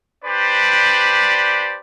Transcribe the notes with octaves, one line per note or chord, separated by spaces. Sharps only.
D4 G4 B4 C5 D5